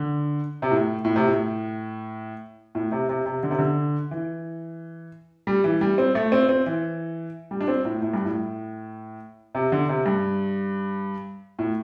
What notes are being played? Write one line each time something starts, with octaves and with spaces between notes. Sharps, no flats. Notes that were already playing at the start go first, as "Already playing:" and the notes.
Already playing: D3
C3
A2
A2
C3
A2
A2
C3
C3
C3
D3
C3
D3
E3
G3
E3
G3
C4
A3
C4
C4
E3
G3
D4
C4
A2
A2
G2
A2
C3
D3
C3
G2
A2